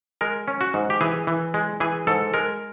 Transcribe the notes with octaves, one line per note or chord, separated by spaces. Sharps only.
G#3 A#4
C#4
F#4
G#2
G4
E3 G#4
E3
G#3
E3 G#4
G#2 A4
G#3 A#4